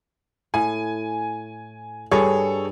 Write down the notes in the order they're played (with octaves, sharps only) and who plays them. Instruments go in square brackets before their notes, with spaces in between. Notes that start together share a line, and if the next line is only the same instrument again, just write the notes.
[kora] A2 [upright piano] G#5
[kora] G2 [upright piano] G#4 A4 C#5